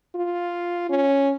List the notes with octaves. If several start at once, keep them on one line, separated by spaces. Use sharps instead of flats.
F4
C#4